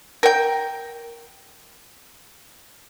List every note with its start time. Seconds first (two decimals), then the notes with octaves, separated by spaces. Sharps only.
0.23 A#4 G5